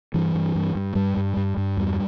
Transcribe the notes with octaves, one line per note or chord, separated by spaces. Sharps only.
G2 E3
G2
G2
G2
G2 G3
G2
G2
G2
E2 G3